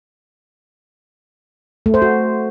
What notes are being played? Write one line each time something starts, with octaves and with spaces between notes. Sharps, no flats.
A3
C5
F#4